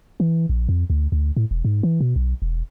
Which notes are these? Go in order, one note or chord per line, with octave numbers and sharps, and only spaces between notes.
E3
A#1
F2
D2
D2
A2
E1
G#2
E3
B2
B1
E1